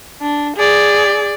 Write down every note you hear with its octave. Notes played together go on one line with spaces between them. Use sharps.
D4
G#4 D5